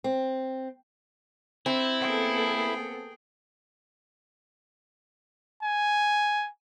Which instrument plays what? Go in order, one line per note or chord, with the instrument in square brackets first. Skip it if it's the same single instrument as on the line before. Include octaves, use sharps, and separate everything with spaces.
[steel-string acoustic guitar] C4
[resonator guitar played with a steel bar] C4 [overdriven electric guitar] E4
[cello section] A#3 B3 A4 [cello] G#4 G5
[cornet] G#5